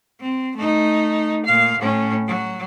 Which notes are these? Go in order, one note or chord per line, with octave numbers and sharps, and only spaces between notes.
C4
A3 D#4
A#2 F5
A2 C#4
F#3